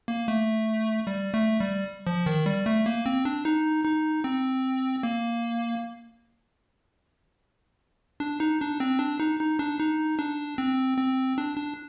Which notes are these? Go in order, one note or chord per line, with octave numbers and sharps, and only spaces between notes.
A#3
A3
G3
A3
G3
F3
D#3
G3
A3
A#3
C4
D4
D#4
D#4
C4
A#3
D4
D#4
D4
C4
D4
D#4
D#4
D4
D#4
D4
C4
C4
D4
D4